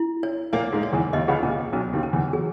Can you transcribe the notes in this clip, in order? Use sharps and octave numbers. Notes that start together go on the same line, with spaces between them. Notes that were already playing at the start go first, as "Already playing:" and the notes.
Already playing: E4
C#5
A#2 A#3 C#5
G#2 G#3
C#5
E2 E3
D#2 D#3 D#5
C#2 C#3
A#2 C#4
B1 B2 C#4
D#2 D#3
C#4
E2 E3
F#3 G#4